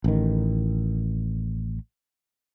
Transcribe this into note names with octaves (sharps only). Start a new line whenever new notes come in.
A1 D#3